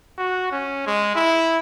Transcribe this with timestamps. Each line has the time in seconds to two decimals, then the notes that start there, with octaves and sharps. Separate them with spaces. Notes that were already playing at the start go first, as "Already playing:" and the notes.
0.18 F#4
0.52 C#4
0.87 G#3
1.16 E4